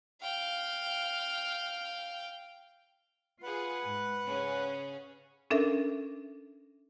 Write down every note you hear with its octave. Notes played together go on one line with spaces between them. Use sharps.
F5 G5
F4 G#4 B4 F#5
G#2
C#3 C#4 G#4
C#4 D4 A4 A#4 E5